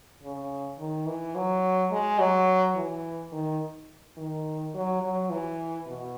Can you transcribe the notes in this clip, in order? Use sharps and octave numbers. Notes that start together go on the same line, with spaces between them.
C#3
D#3
E3
F#3
G#3
F#3
E3
D#3
D#3
F#3
F#3
E3
B2